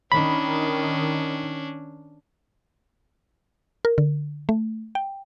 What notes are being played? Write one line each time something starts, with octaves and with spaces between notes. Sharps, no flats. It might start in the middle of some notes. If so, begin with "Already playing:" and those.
D#3 C#4 D4 B5
A#4
D3
A3
G5